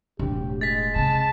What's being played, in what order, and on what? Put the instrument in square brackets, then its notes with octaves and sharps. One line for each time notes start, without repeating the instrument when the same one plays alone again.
[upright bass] E1 A2 [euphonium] G4
[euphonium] G#3 [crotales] A6 B6
[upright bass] C3 [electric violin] A5